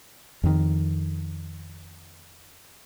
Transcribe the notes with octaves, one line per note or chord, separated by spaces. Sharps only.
F2 D#3